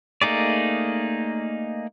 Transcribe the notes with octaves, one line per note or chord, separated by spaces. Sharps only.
A3 A#3 D#4 G#4 D5